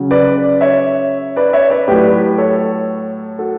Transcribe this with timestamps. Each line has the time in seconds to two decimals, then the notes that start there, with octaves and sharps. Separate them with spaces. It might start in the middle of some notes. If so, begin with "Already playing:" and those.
Already playing: C#3 F#3
0.11 B4 D5
0.61 C#5 E5
1.36 B4 D5
1.53 C#5 E5
1.70 B4 D5
1.88 A2 F#3 G4 B4
2.38 A4 C#5
3.39 F#4 A4